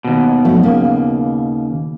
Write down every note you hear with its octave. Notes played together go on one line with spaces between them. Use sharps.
D#2 B2
F2 F#3 A3
C#3 A#3